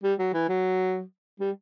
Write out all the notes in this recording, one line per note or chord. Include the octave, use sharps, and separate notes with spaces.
G3
F#3
E3
F#3
G3